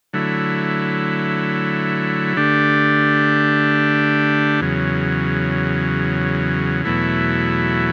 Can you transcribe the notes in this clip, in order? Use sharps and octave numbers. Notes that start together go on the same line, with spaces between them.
D3 F#3 A3 E4
D3 A3 D4 G4
E2 C#3 F#3
E2 B2 F#3 A3 E4